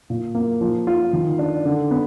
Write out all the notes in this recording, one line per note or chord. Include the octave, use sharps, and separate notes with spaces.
A#2
A#3
F3
F4
D#3
D4
D3
B3